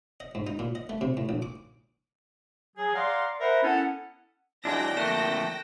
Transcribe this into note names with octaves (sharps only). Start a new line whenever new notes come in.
D#5
G#2
D#4
A#2
D#5
A3
C3
A2
A#1
D6
F#3 G#4
D5 F5 F#5 A#5 C6
A#4 C5 E5 F#5 A#5 B5
B3 C#4 E4 A4 F#5
F#3 G#3 D4 E4 D5 G5 A#6
F2 A3 A#3 F#6 E7